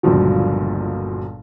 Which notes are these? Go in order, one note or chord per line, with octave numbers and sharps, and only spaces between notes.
G1 C#2 A#2 F3 F#3